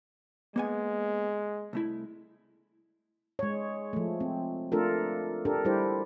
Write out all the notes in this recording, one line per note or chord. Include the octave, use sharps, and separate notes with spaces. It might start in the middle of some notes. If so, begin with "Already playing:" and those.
G#3 A#3 B3 G#5
C2 A3 E4
G#3 C#5
F3 A3
C4
A3 D4 F4 A4 A#4
D4 G4 A4 A#4
G3 E4 G4 C5